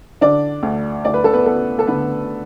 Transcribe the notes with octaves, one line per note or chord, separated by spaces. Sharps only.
D3 D4 D5
D2
D2 D5
B4
A4
B3 B4
B3 A4
A4
D3 B3 B4